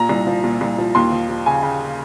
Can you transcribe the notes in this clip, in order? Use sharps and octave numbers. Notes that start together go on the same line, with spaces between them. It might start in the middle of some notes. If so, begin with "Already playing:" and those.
Already playing: A#2 A#5
C2
F3
A#2
C2
F3
D#2 C6
F3
F3
C#3 G#5
C#3